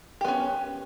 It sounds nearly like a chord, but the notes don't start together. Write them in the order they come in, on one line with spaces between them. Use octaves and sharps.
G4 B3 C#4